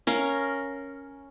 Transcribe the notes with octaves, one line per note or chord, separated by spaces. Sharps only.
C#4 A#4 F5